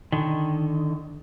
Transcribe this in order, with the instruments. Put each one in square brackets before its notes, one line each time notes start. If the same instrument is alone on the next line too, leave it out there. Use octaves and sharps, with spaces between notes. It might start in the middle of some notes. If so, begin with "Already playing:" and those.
[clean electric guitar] D3 D#3